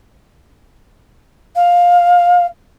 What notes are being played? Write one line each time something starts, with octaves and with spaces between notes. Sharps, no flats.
F5